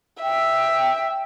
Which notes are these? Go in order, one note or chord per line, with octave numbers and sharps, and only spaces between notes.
E5 G5